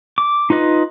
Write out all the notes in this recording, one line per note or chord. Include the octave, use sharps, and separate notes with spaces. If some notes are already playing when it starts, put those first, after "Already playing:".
D6
D#4 F4 B4 D#5